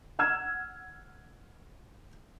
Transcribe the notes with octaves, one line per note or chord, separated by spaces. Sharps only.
F#5 E6 F6 G#6 E7